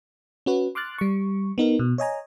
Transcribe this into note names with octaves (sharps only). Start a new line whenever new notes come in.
C#4 F#4 B4
C6 D6 F6 F#6 A6
G3 C#6
B3 D#4 A#4
B2
C#5 D#5 G#5 A#5